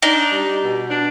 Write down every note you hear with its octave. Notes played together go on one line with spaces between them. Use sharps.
D4 D#4
G3
B2
D4